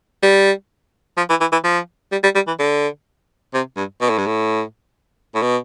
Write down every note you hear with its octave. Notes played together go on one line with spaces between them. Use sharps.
G3
F3
E3
E3
E3
F3
G3
G3
G3
E3
D3
C3
G2
B2
A2
G2
A2
A2
B2